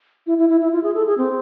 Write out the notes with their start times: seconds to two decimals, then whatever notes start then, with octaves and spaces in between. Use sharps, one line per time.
0.27 E4
0.38 E4
0.49 E4
0.60 E4
0.72 F4
0.83 G#4
0.94 A4
1.06 G#4
1.17 C4